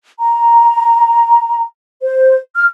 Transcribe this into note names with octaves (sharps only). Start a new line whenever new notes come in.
A#5
C5
F6